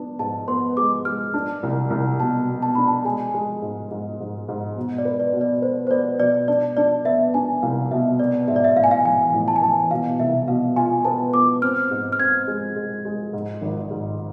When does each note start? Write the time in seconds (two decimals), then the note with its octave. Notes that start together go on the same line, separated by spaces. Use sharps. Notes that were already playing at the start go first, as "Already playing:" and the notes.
Already playing: B3 D4
0.19 G#2 A5
0.48 B3 C6
0.77 G#3 D6
1.05 G#3 F6
1.34 D4
1.63 C2
1.90 C2
2.20 B2 A5
2.48 B2
2.62 A5
2.75 D4 B5
2.88 A5
3.05 G#3 G#5
3.34 G#3
3.62 G#2
3.91 G#2
4.20 G#2
4.48 G#2
4.76 B2
4.98 D5
5.05 B4
5.20 D5
5.33 B2
5.41 D5
5.62 B4 C5
5.87 C5
5.90 B3 D5
6.19 B2 D5
6.48 D4 D5
6.77 D4 D5
7.05 B3 E5
7.34 D4 G#5
7.62 C2 F5
7.91 B2 E5
8.19 B3 D5
8.47 G#2 E5
8.56 D5
8.64 E5
8.76 A1 F5
8.84 G#5
8.91 F5
9.05 E3 G#5
9.34 A1
9.48 A5
9.56 G#5
9.62 E3 A5
9.90 B2 F5
10.19 C2 E5
10.48 B2 F5
10.76 F4 G#5
11.05 B3 A5
11.34 B3 D6
11.62 C4 F6
11.91 G#2
12.12 F6
12.19 C4 G#6
12.48 G#3
12.76 G#3
13.05 G#3
13.33 G#2
13.62 G#1
13.91 G#2